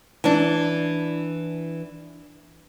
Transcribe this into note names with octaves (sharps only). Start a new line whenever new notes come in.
E3 D4